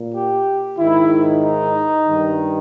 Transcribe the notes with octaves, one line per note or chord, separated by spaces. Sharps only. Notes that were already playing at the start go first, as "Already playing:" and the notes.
Already playing: A#2
G4
G#2 D#3 E4
D#4
G2 D#3